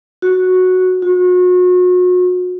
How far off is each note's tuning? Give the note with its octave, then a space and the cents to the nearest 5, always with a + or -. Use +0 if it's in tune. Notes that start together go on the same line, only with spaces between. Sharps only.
F#4 -5
F#4 -35